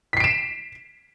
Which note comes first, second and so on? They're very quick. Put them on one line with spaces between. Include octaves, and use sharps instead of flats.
B6 C7 D7 E7